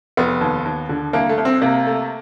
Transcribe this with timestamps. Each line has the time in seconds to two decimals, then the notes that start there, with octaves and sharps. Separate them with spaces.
0.17 F1 B3
0.41 D#2
0.65 D#2
0.89 D3
1.13 C2 A#3
1.29 A3
1.38 C2
1.45 C4
1.61 C3 A#3
1.87 A3